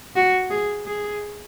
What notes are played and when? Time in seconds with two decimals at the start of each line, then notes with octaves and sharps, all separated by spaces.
0.16 F#4
0.50 G#4
0.87 G#4